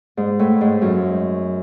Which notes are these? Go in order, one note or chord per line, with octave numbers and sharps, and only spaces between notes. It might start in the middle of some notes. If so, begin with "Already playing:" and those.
G#2
A2
G#2
F#2